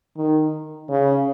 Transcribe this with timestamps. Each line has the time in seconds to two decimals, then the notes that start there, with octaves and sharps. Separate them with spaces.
0.17 D#3
0.90 C#3